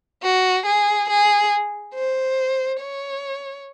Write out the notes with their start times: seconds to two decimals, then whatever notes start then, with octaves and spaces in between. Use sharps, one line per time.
0.23 F#4
0.66 G#4
1.09 G#4
1.94 C5
2.81 C#5